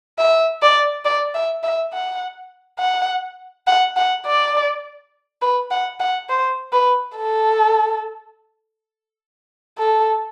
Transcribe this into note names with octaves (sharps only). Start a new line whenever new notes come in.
E5
D5
D5
E5
E5
F#5
F#5
F#5
F#5
D5
B4
F#5
F#5
C5
B4
A4
A4